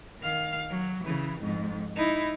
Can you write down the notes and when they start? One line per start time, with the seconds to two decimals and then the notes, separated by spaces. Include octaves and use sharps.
0.20 D#3 F5
0.71 F#3
1.04 C#3 E3
1.41 F2 G#2
1.96 D#4 E4